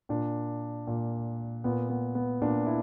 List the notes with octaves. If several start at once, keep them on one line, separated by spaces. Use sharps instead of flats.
A#2 D4
A#2
A#2 B3
B3
B3
A#2 D4
E4